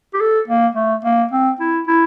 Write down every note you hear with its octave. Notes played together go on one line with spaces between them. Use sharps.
G4
A4
A#3
A3
A#3
C4
E4
E4